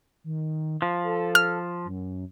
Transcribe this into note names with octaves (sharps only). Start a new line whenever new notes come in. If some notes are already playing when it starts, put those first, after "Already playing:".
D#3
F3
A4
F6
F#2